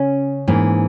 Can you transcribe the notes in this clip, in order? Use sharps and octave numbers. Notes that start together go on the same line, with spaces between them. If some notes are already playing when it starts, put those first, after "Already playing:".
Already playing: C#3 C#4
G#2 E3 A#3